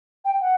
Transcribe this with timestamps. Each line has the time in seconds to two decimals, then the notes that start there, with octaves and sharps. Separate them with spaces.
0.25 G5
0.41 F#5